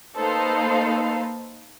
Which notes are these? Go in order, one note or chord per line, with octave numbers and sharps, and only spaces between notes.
A#3 D#4 A4 B4 C5 F5